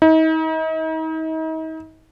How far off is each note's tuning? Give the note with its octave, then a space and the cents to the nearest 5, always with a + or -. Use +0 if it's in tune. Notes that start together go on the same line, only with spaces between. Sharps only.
D#4 +40